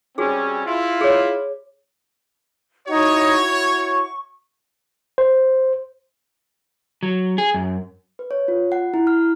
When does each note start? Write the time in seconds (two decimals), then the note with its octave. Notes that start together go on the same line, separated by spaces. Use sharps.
0.18 G3 C4 C#4 F#4 G#4
0.66 E4 F4
1.01 G#4 C#5
2.88 D#4 E4 F#4 C#5 D#5
3.42 C#6
5.18 C5
7.03 F#3
7.38 G#4
7.54 F#2
8.19 B4
8.31 C#5
8.48 F4
8.72 F#5
8.94 E4
9.07 F6